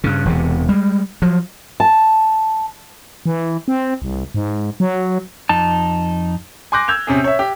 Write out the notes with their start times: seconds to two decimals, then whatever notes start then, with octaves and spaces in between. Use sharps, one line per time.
0.04 G2 C#3
0.25 E1 E2 C3
0.69 G3 G#3
1.22 F3 F#3
1.80 A5
3.26 E3
3.68 C4
4.02 C2
4.34 G#2
4.80 F#3
5.49 F2 D#4 A5
6.72 G#5 C6 D6 F#6 G6 A#6
6.88 E6 G6 G#6 F7
7.07 C3 C#4 G#4
7.24 C#5 E5
7.39 G4